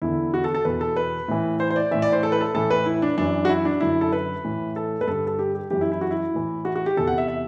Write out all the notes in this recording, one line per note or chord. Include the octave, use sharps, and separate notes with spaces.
E2 D3 E4
F#4
A4
A4
E2 B2 B4
A4
B4
A2 E3
C5
C5
D5
A2 E3 E5
D5
C5
A4
B4
A4
A2 E3 A4
B4
E4
D4
F#2 E3 D4
F#4
E4
D4
F#2 D3 E4
A4
B4
A2 E3
A4
B4
G2 D3 A4
A4
G4
G4
F#2 E3 G4
E4
E4
F#4
E4
A2 E3
F#4
F#4
G4
E2 C3 E3 A4
F#5
E5
E5